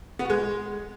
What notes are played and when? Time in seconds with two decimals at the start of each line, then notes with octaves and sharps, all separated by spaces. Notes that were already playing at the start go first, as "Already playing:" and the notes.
0.19 B3
0.24 F#4
0.30 G#3